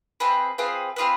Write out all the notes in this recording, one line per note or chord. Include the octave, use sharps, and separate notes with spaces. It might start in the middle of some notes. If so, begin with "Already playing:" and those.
C4 F4 G#4 B4
C4 F4 G#4 B4
C4 F4 G#4 B4